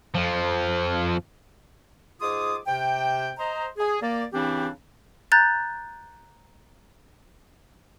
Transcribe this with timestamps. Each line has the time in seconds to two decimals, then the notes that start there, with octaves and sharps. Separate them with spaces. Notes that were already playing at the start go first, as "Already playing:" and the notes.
0.15 F2 F3
2.21 G#2 F4 G#4 D6 D#6
2.67 C3 G5
3.38 C5 D#5 A#5
3.78 G#4
4.01 A#3 D5
4.33 C#3 E3 C4 D4 E4 G4
5.32 A#5 F#6 G6 A6